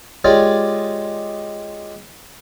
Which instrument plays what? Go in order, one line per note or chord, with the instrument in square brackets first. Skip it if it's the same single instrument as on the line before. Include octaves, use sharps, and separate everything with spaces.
[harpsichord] G#3 F4 G4 C#5 D5 F5